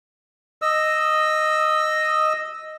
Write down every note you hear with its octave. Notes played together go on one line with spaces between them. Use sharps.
D#5 E6